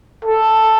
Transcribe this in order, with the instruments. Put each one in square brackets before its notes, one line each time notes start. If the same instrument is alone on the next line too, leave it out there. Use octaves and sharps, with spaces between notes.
[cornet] A4